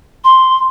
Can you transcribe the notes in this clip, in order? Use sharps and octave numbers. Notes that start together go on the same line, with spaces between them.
C6